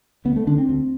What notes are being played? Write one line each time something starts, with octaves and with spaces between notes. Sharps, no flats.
D2 B3
A3
D3 D4
C4
D2